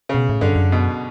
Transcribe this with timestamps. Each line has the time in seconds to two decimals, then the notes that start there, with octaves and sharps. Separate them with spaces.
0.09 C#3
0.15 B2
0.30 A2
0.41 G2 D3
0.56 F#2
0.72 B2